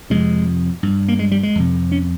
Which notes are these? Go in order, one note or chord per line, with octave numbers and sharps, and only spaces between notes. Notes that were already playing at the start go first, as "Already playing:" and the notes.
F2 C3 G#3
G2
A#3
G#3
G3
G#3
F2 C3
C#4